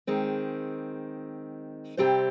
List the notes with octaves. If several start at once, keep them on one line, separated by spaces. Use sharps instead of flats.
D#3 G#3 C4
C3 G3 C4 G4 C5